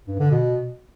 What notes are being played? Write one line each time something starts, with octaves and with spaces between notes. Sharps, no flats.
G2
D3
B2